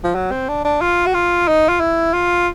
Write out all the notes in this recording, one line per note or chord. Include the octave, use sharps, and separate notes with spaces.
F3
F#3
C4
D4
D4
F4
F#4
F4
D#4
F4
E4
F4